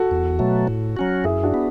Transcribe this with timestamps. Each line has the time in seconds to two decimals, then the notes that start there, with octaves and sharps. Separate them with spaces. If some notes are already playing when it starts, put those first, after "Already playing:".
Already playing: F#4 A4
0.11 E2
0.39 B2 F#3 A3
0.68 A2
0.97 F#3 C#4 F#4
1.24 F#2 E4 G#4
1.43 D4 F#4
1.54 B3